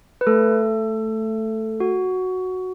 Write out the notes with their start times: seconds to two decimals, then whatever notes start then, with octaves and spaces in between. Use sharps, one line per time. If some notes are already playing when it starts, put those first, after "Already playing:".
0.21 B4
0.27 A3 A4
1.80 F#4